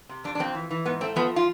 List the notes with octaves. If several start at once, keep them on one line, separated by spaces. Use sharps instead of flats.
C3
F2 D4
D4
F2 C4
E3
E3
G#2 B3
A3 C4
F3 B3
F4